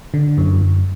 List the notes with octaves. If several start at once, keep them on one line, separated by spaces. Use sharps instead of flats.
D3
F#2
F#2